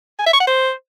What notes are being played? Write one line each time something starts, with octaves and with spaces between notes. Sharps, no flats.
G#5
E5
C#6
F#5
C5